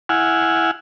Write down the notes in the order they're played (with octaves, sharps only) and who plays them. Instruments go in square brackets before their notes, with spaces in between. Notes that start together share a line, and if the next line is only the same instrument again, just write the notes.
[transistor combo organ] E4 F#5 G#5 F6